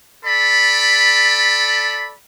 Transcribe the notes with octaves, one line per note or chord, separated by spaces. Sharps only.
A4 D5 B5